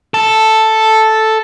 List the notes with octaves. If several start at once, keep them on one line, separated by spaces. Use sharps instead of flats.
A4